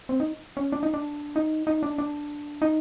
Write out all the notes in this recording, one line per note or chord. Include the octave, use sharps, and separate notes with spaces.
C4
D#4
C#4
D4
D#4
D4
D#4
D#4
D4
D4
D#4